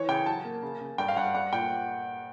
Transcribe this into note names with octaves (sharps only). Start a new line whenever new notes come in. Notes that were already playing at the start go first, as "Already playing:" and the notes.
Already playing: E3 C#5
C#3 G5
F#3 A5
A#3
C#3
C#3
G2 G5
F5
G2 F#5
G3 F#5
A#2 G5